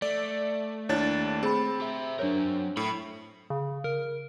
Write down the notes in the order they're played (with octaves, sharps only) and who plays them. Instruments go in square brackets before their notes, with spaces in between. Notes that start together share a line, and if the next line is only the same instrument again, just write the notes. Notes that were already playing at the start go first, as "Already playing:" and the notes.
[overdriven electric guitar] A3 [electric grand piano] D5
[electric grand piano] D#2 D4 A6 [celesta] E4 C#5
[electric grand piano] C4 [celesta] G#4 B5
[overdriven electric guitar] G4 E5
[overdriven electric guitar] F#3 A#4 [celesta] D4 C#5
[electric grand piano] A2 [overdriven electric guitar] B5
[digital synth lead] C#3
A#4